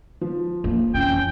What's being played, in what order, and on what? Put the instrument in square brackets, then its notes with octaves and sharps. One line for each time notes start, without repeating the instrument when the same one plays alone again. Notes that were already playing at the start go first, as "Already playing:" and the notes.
[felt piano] F3
[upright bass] A#3 D4
[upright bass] F2 E3 [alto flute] C#4 [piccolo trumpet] G5